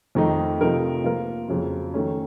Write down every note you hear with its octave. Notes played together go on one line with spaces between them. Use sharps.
F2 D#3 A3 D#4
C3 F3 A3 D#4 A#4
F3 A#3 F4 A#4
F2 C#3 F#3
D#3 A3 C#4